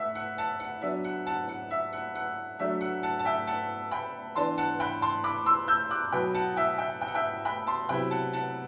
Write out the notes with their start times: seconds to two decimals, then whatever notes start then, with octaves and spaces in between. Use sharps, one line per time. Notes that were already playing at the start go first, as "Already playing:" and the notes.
Already playing: A3 E5 F#5
0.15 F#5
0.38 F#5 A5
0.60 F#5
0.82 F#3 B3 D4 E5
1.04 F#5
1.27 F#5 A5
1.49 F#5
1.71 E5
1.93 F#5
2.15 F#5
2.59 F#3 A3 D4 E5
2.81 F#5
3.03 F#5 A5
3.19 A5
3.25 E5 G5
3.47 F#5 A5
3.91 G5 B5
4.35 E3 B3 D4 A5 C6
4.58 F#5 A5
4.80 G5 B5
5.02 A5 C6
5.24 B5 D6
5.46 C6 E6
5.68 E6 G6
5.91 D6 F#6
6.12 B2 F#3 B3 G5 B5
6.34 F#5 A5
6.57 E5 G5
6.78 E5 G5
7.01 G5
7.08 F#5
7.15 E5 G5
7.45 G5 B5
7.67 A5 C6
7.89 C3 F#3 B3 E4 G5 B5
8.11 F#5 A5
8.33 F#5 A5